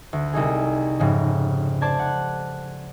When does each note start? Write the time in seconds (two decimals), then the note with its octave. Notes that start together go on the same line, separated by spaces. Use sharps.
0.13 D2
0.33 C2 D#4 G#4
1.00 F1 G#2 C#3
1.81 C5 D5 A5 G#6
1.99 F#5